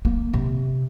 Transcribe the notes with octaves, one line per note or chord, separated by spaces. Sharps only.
A#3
C3